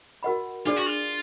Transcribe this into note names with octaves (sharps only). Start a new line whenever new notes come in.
F#4 A#4 D#5 F#5 B5
D4 F4 G#4 D5
F#4
F4